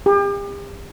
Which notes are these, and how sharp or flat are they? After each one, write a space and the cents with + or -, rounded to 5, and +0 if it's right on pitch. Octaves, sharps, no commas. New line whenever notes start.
G4 +40